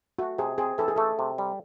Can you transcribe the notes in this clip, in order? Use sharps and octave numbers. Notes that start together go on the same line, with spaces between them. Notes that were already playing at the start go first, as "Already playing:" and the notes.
A3 F#4
C3 G#4
C4 G#4
E3 A4
G#4
A3 A4
C3
G3